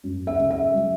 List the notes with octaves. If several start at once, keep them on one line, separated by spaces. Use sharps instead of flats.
F#2
E5
C#3
E5
F#3